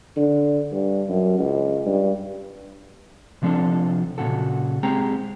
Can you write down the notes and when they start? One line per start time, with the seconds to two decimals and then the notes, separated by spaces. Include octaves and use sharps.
0.17 D3
0.72 G2
1.09 F#2
1.39 C#2
1.86 G2
3.42 C3 F3 C4 D4 A4
4.18 A#2 C#3 F#4 A4
4.83 G#3 C4 G4 G#4 A#5